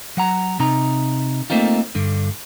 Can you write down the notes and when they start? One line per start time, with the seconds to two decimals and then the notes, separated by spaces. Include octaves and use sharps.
0.17 F#3 F#5 A#5
0.60 C3 D#4 A#5
1.50 A3 A#3 C4 D#4 F4
1.95 G2 D3